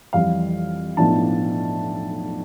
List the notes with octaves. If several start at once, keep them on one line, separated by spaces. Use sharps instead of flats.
F2 E3 G3 F5
B1 A2 F3 B3 D4 A5